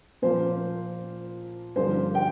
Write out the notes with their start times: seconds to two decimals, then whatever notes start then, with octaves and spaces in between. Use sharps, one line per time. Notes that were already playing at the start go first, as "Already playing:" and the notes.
0.22 A#2 F3 A#3 C5
1.76 G2 D3 F3 A#3 C5
2.15 G5